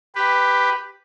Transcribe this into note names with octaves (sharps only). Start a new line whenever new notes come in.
G4 B4